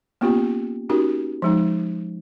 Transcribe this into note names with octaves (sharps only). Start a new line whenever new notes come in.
A#3 B3 C#4 F4 G4
C#4 D#4 F#4 G4 A#4
F3 G#3 D#4